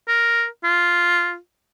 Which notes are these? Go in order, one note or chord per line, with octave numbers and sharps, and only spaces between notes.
A#4
F4